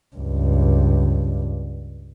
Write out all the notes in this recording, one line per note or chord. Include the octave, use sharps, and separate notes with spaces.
C#2 G2